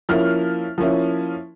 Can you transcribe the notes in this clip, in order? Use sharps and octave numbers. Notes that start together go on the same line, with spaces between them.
F3 A#3 C#4 E4 F6
F3 A#3 C#4 E4